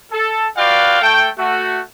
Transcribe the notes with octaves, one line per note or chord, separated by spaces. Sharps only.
A4
F4 F#4 B4 D5 F5 G5
A3 A4 G5
A3 F#4